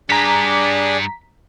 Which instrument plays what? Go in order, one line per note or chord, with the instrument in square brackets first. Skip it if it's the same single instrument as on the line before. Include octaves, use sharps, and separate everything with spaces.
[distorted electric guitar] G2 G4 [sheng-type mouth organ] D4 G#4 D5 [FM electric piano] A#5 B6